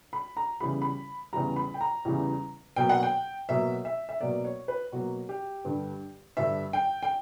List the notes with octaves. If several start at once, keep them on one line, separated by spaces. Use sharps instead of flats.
B5
A#5
E2 C#3 E3 G3 B5
B5
E2 C#3 E3 G3 A#5
B5
G5
A#5
E2 C#3 E3 G3
B2 F#3 A#3 G5
F#5
G5
B2 F#3 A#3 E5
E5
E5
B2 F#3 A#3 D5
C#5
B4
B2 F#3 A#3 F#4
G4
G2 D3 G3
G2 D3 G3 E5
G5
G5